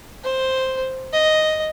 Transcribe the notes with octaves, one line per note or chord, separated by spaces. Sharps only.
C5
D#5